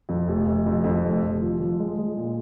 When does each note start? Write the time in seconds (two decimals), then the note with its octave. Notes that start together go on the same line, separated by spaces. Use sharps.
0.09 F2
0.28 F1
0.46 F1
0.66 F2
0.84 F2
1.04 F1
1.23 F1
1.41 F3
1.60 F3
1.79 G#3
1.98 G#3
2.17 A#2